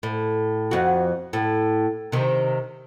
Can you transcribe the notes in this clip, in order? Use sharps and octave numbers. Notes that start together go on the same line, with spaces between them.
A2
F2 F#4
A2
C3 D#3